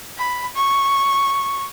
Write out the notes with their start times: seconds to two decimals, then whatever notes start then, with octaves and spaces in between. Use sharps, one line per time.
0.18 B5
0.56 C#6